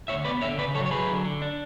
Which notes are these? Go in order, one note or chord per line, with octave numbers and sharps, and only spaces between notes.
D2 C#5 E5
B3 B4 D5
D3 C#5 E5
C#3 B4 D5
F#3 A4 C#5
C#5
F#3 G#4 B4
D3
D3
D4